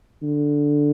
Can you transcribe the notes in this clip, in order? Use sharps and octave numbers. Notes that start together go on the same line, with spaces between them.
D3